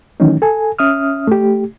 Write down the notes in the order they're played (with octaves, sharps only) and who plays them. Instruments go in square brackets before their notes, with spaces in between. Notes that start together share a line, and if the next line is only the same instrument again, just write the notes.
[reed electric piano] D#3 E3 F#3 A3 C#4 D#4
A4 G#5
C#4 E5 D#6 F6
A3 G4